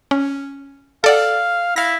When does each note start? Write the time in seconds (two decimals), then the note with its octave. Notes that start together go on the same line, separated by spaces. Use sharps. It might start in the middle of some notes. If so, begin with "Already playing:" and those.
0.11 C#4
1.04 A4 D5 F5 F#5
1.76 E4 F5 A#6